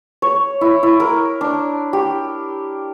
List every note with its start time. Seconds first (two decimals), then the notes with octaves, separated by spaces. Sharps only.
0.22 C#5
0.61 E4
0.83 E4
1.00 A#4
1.41 D4
1.93 G4